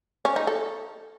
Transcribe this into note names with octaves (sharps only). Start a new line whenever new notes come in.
C#4
D#4
A4